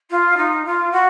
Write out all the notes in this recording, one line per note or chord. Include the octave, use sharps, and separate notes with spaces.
F4
D#4
F4
F#4